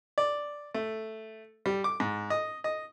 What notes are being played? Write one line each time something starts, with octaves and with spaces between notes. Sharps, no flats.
D5
A3
G3
D6
G#2
D#5
D#5